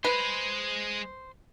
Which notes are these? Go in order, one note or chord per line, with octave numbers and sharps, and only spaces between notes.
G#3 G#4 B4 C5